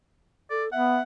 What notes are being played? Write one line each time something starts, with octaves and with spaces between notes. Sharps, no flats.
A4 D5
B3 E5 F#5